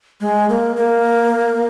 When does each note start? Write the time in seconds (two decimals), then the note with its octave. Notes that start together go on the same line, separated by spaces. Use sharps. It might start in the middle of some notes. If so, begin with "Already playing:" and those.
0.21 G#3
0.49 A#3
0.76 A#3